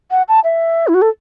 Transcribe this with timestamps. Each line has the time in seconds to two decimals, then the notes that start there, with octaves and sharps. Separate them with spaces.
0.11 F#5
0.28 A5
0.44 E5
0.88 E4
0.94 F#4
1.02 A4